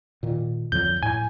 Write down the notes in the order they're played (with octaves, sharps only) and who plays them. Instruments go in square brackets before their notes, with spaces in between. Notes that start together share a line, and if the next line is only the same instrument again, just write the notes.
[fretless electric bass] A#2 D#3
[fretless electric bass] F2 D3 F#3 [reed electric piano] G6
[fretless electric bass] A2 [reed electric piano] G#5